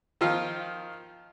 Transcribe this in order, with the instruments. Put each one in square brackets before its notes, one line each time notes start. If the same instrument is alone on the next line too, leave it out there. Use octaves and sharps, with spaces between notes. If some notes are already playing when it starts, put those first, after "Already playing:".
[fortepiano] D#3 F3 F4 F5